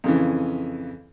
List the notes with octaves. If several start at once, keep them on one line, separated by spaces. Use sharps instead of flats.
F2 C#3 E3